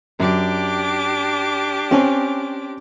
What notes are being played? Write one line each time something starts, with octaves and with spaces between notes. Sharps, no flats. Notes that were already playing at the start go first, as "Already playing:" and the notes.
F#2 D4 G4 D6
C4 C#4 G#5